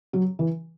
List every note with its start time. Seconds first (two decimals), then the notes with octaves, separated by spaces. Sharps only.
0.13 F#3
0.39 E3